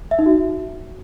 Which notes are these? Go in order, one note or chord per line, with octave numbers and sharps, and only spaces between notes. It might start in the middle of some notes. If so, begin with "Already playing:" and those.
E5
D#4
F#4